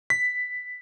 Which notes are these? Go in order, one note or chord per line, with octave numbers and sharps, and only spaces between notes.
B6